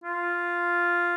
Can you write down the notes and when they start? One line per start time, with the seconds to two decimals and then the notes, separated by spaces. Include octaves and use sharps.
0.04 F4